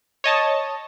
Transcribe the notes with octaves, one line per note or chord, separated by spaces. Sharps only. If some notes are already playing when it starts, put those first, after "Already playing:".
C#5 D#5 A5